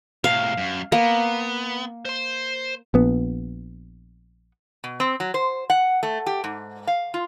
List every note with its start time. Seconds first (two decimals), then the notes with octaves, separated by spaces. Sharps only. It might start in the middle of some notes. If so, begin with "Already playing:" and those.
0.24 A2 C3 F5
0.57 F#2
0.92 A#3 B3
2.05 C5 C6
2.94 A#1 B3
4.84 B2
5.00 C4
5.20 F#3
5.34 C5
5.70 F#5
6.03 A3
6.26 G4
6.44 G#2
6.87 F5
7.14 F4